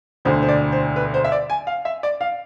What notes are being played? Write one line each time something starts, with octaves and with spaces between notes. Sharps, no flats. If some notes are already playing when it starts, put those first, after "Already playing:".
E1 D2 D3 C5
C5
D5
C5
B4
C5
E5
D5
G#5
F5
E5
D5
F5